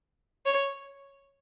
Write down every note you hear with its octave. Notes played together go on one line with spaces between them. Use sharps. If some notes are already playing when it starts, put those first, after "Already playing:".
C#5